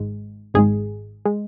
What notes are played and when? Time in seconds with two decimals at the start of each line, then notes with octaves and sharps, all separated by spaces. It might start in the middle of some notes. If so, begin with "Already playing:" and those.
Already playing: G#1 G#2 G#3
0.54 G#1 G#2 G#3 G#4
1.26 G#3